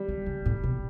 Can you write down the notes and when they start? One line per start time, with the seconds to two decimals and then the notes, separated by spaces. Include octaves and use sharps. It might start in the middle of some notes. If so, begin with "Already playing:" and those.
Already playing: G3
0.08 D3
0.26 C#3
0.46 A2
0.64 B2